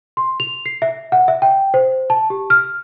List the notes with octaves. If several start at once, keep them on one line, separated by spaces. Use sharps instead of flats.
C6
F7
C7
E5
F#5
E5
G5
C5
A5
G4
F6